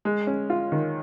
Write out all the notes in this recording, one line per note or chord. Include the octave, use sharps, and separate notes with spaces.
G#3
C#4
F4
D#3